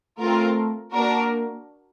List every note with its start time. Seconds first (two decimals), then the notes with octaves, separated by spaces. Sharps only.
0.18 A3 C4 F4 A#4
0.93 A#3 D4 F#4 A#4